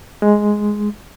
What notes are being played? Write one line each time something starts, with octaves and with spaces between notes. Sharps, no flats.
G#3